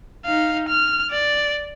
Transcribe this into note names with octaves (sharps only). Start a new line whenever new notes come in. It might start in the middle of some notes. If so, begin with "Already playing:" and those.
D#4 F5
F6
D5